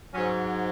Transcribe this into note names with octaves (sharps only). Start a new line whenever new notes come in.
G#2 F#3 C#4